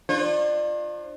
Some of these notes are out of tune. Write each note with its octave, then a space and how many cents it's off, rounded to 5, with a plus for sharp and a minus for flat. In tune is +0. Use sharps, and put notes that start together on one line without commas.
D4 +35 F4 +0 C5 +45